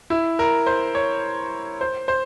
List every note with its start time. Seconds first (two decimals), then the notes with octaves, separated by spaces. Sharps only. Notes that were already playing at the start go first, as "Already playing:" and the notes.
0.10 E4
0.39 A#4
0.66 C5
0.95 C#5
1.81 C5
2.08 C5